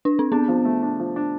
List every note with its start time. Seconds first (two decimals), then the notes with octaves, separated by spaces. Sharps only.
0.05 D4
0.19 C4
0.32 B3 D4
0.48 F3
0.65 A3
0.83 D4
0.99 F3
1.16 D4